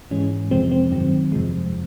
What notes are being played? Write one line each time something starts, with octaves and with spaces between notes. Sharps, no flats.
G#2 E3 G#3 C#4
F2 C3 F3 G#3 C4
C4
G2 D#3 F#3 C4
F2 C3 F3 G#3